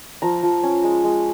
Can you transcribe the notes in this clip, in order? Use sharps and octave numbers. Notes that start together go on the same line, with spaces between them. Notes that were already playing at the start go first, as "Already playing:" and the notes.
F3 A#5
F3
C#4
G#3
G#3